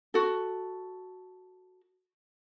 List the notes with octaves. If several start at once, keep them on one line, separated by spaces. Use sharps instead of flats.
F#4 A4